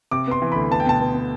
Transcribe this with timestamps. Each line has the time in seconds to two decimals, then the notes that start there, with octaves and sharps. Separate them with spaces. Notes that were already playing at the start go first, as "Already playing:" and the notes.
0.11 C3 D6
0.27 B3 C6
0.42 E3
0.52 D2 B5
0.71 B3 A5
0.80 G5
0.86 B2 A5
1.00 B3
1.15 B3